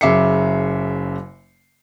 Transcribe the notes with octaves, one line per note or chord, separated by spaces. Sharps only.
F#1 C#3 E5 D6 C7 C#7